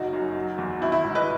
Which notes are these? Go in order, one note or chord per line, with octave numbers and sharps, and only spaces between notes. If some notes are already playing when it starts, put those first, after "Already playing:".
Already playing: F#1 D#4 F#4
F#2
F#3
E2
G#1 E4
E4
G#2
B4 D#5